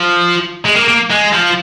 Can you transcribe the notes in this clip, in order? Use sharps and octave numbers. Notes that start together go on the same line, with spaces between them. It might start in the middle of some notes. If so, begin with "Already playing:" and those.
Already playing: F3
G#3
A#3
A#3
G#3
F3